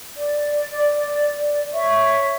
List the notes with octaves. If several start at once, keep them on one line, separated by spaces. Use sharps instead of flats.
D5
C#5 E5 C#6